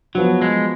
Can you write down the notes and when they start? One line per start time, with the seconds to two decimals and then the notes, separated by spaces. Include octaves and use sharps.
0.15 F3 F#3 B3 F#4
0.42 G#3